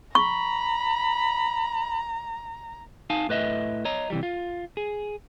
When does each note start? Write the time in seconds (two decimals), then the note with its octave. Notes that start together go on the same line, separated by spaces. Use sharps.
0.15 A#5 B5 C#6
3.10 D#4 F5 G#5 A5
3.29 A2 B4 D#5 E5
3.85 C#5 D#5 A#5
4.10 C3 E3 G3
4.23 F4
4.77 G#4